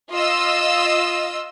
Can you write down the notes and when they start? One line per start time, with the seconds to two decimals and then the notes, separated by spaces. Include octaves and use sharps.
0.12 F4 D#5 E6